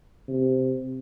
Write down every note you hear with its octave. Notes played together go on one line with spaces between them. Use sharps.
C3